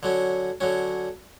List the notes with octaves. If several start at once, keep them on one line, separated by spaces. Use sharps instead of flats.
D3 F#3 C#4
D3 F#3 C#4